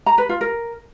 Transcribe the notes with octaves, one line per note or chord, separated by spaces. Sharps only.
A#5
B4
F4
A#4